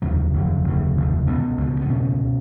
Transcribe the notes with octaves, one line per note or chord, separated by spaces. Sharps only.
F1 D#2 C#3 F#3
F1 D#2 C#3
F1 D#2 C#3
F1 D#2 C#3
C#2 B2 B3
C#2 B2
B3
C#2 B2 C#4
B2